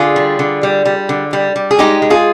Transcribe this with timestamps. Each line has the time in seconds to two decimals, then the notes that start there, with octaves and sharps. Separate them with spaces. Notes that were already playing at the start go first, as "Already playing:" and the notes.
Already playing: D3 F4 G#4
0.16 G3
0.39 D3
0.63 G3
0.85 G3
1.09 D3
1.33 G3
1.56 G3
1.71 G#4
1.79 G#3 D#4 G4
2.02 G#3
2.10 F4 G#4